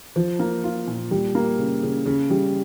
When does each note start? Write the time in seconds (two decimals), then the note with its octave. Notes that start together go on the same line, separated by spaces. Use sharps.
0.16 F3
0.39 A#3
0.64 F4
0.87 A#2
1.11 G3
1.35 A#3
1.59 C#3
1.83 C#3
2.06 C#3
2.30 G3